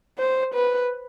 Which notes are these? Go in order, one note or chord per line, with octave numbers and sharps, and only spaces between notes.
C5
B4